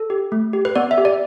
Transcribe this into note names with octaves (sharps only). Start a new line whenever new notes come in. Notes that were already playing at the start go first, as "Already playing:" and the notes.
Already playing: A4
G4
A3
G4
B4
B3 D5
E5
G4
D5